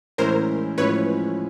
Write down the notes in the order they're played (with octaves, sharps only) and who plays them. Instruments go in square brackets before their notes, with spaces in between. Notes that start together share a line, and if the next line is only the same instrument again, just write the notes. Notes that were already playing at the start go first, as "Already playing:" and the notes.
[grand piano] A2 E3 G#3 C#4 E4 [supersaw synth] A#4 C5
[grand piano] A2 F3 G#3 C#4 E4 [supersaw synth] B4 C#5